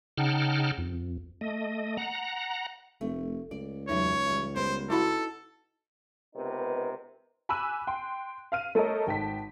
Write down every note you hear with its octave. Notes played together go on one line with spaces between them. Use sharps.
C#3 D#4 F#5 G5 A5 F6
F2
A3 D#5
F#5 A#5
F1 A3
C#2 D5
E2 A2 F#3 D#4 C#5
E3 G3
G3 B3 A#4 C5
D#4 E4 F#4 A4 D#5 F#5 B5
C#2 C3 B3 D#4 A#4 B4
G#5 B5 D6 E6 F#6 D#7
G5 C6
F5 F6 D#7
A3 A4 A#4 C#5 D#5
G#1 G5 A5 B6